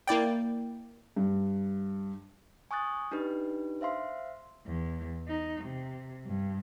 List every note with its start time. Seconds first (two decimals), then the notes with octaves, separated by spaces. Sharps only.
0.07 A#3 E4 D5 G5
1.16 G2
2.71 G#5 C#6 D#6 F#6 A6
3.11 D4 D#4 G4 B4
3.81 C5 E5 F5 C6
4.66 E2
5.27 D#4
5.63 C3
6.25 G2